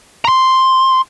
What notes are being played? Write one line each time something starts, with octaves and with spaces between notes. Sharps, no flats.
A#5 C6